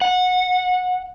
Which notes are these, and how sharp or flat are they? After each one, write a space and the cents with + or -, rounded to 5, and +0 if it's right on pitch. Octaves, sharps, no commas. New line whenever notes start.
F#5 -20